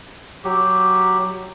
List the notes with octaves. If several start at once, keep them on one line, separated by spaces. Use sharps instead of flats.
F#3 G4